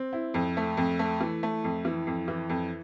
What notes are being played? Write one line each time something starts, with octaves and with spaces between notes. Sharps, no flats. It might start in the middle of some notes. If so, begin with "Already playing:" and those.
Already playing: C4
E4
F2
A3
F2
A3
E3
A3
F2
E3
F2
E3
F2